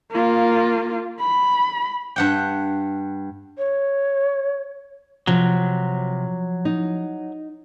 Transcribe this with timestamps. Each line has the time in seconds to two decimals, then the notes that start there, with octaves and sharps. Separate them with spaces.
0.12 A#3 F4
1.20 B5
2.16 G2 F#5 G5
3.58 C#5
5.27 C3 F3 F#3
6.65 D#4